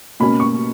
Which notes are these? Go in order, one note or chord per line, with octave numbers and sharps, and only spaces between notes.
B2 A#3 C#4 B5
C#6